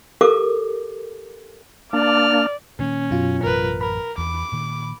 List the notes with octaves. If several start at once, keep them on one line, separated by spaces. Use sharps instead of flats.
G4 A4 A#4 D6
A#3 D4 D5 F6
A#2 D#3 A#3 C#4
F#2 B2 F#3 F4
A1 F#2 A#4 B4
A#4 B5
E2 D6
A#2 D#3